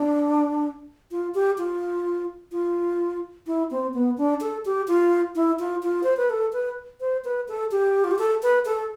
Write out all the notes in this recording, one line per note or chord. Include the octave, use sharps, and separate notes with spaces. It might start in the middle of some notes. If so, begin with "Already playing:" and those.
Already playing: D4
F4
G4
F4
F4
E4
C4
B3
D4
A4
G4
F4
E4
F4
F4
C5
B4
A4
B4
C5
B4
A4
G4
F4
G4
A4
B4
A4